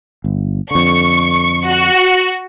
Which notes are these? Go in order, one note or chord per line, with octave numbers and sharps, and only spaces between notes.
G1
F2 D3 C#6
F#4